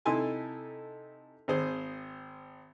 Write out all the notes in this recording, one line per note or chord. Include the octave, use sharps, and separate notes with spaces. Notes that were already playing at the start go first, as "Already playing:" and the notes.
C3 D#4 E4 A4 G#5 C6
G#1 G#4 C5